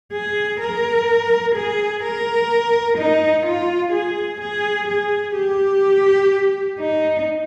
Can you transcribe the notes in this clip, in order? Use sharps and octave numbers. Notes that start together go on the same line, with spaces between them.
G#4
A#4
G#4
A#4
D#4
F4
G#4
G#4
G#4
G4
D#4